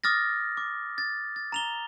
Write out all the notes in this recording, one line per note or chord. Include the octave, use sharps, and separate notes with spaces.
D6 D#6 F6 A6 A#6
D6
A6
A6
A#5 F7 G7